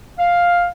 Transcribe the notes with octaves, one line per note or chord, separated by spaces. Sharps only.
F5